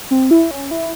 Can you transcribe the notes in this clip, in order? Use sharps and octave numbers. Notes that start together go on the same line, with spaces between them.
C4
E4
C#4
E4